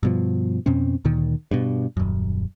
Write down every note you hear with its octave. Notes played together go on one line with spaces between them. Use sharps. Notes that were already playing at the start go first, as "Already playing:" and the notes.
G2 B2 F3
F2 B2 C4 C#4
D2 A#2 D#3
G2 B2
D#1 F#2